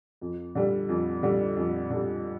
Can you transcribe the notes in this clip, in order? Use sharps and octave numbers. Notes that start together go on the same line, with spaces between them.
F2
D3 G3
F2
D3 G3
F2
D3 G3